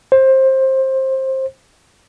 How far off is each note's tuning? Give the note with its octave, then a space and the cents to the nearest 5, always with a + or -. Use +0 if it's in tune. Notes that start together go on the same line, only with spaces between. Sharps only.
C5 +20